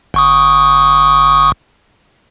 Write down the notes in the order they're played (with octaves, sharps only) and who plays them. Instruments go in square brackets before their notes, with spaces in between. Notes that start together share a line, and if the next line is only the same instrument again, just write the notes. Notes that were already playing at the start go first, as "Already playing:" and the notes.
[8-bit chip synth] G1 C#6 D#6